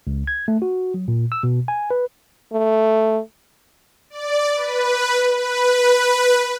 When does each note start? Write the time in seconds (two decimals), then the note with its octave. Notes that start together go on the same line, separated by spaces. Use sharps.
0.07 C#2
0.27 G#6
0.48 A3
0.62 F#4
0.94 F#3
1.08 A#2
1.32 E6
1.43 B2
1.68 G#5
1.91 B4
2.53 A3
4.10 D5
4.56 B4
5.37 B4